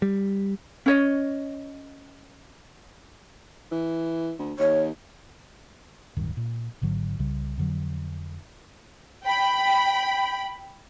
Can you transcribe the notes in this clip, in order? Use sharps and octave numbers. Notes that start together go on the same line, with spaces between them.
G3
C#4 C#5 D#5
E3
D2
D#2 C#5
D1 G2 D#3
A#2
G#1 G#2 D3 F#3
C2 C#3 G3
F2 D3 F#3
G5 B5